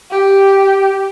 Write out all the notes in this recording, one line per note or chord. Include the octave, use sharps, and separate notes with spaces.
G4